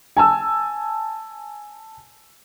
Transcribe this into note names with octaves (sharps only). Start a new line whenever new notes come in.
G#5 A5 E6